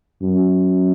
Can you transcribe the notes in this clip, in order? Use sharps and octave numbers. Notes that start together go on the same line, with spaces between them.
F#2